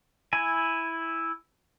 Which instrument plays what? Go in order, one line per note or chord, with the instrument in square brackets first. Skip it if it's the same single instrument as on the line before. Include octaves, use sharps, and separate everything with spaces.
[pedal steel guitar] E4 G#5